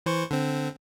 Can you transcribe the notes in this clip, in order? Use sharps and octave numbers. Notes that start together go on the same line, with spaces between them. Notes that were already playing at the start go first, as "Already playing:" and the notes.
E3 C5 C#6
D3 C4